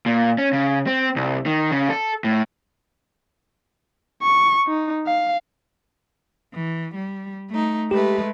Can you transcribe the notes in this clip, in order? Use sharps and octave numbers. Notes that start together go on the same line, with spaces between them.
A#2
C#4
C#3
C4
C2
D#3
C#3
A4
A2
C#6
D#4
F5
E3
G3
A3 D#4
G#3 A3 G4 B4